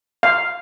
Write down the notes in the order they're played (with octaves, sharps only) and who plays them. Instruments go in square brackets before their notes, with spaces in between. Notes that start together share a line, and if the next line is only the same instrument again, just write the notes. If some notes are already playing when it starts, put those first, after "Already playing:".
[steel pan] F5